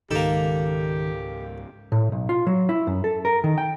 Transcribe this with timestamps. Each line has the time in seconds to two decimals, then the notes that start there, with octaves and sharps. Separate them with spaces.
0.11 C#2 G#2 D#3 G#3 A#3 G4 A4
1.92 A2
2.12 B1
2.29 F4
2.47 F#3
2.69 E4
2.87 F#2
3.04 A4
3.25 A#4
3.44 D#3
3.58 G5